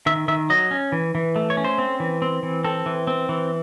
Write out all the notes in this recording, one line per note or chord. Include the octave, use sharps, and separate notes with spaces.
D#3 E5
D#3 E5
F#3 D#5
C#4
E3
E3
A3
C#5
C#4
C5
C4
E3
C4
E3
C4 A4
E3
C4
E3